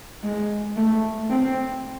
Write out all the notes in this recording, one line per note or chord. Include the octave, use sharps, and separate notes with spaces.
G#3
A3
C4